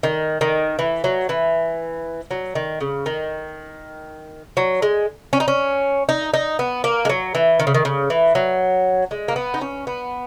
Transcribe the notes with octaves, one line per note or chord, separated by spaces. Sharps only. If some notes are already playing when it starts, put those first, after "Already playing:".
D#3
D#3
E3
F#3
E3
F#3
D#3
C#3
D#3
F#3
G#3
C#4
D#4
C#4
D#4
D#4
B3
A#3
G#3
F#3
E3
D#3
C#3
D#3
C#3
E3
F#3
G#3
A#3
B3
D#4
C#4
B3